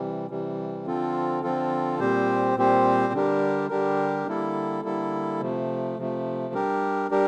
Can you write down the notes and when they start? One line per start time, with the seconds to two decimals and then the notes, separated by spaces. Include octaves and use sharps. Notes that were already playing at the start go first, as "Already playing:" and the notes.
Already playing: C3 E3 G3
0.30 C3 E3 G3
0.86 D3 F3 C4 F4 A4
1.43 D3 F3 C4 F4 A4
2.00 A#2 G3 C4 G4 C5
2.56 A#2 G3 C4 G4 C5
3.13 D3 G3 D4 G4 A#4
3.70 D3 G3 D4 G4 A#4
4.27 D3 G3 A#3 E4 A4
4.84 D3 G3 A#3 E4 A4
5.41 C3 F3 A3
5.97 C3 F3 A3
6.54 G3 D4 G4 A#4
7.11 G3 D4 G4 A#4